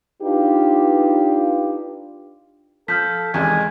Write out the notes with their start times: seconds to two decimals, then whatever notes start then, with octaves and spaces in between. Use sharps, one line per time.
0.22 D4 D#4 F4 G4 B4
2.88 F3 A4 F6 G6 B6
3.34 E2 C3 D#3 G#3 G#5